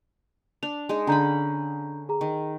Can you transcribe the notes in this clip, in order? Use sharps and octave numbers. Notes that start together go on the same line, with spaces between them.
D4 F7
G#3 D#4 G#4
D3 C#4 D4 A#5 B5 G6
G#4 A#5
D#3